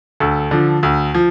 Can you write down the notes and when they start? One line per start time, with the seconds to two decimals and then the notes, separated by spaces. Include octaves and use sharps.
0.20 D2 A4
0.51 D3 F3
0.83 D2
1.14 F3